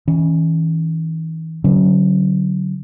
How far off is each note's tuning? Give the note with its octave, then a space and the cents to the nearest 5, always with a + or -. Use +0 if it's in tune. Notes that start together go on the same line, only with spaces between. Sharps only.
E3 -40 C#4 +0
D3 -15 F#3 +15 C#4 +0